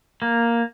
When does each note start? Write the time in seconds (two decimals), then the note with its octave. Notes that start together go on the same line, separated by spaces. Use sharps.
0.22 A#3